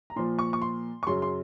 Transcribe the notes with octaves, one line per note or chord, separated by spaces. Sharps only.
A#5
A#2 F3 C6
C#6
C#6
C6
C#6
F#2 C#3 F#3 C6
C6